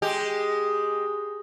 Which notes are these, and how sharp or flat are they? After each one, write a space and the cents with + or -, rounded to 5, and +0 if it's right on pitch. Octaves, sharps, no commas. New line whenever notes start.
G#3 +0 G4 +0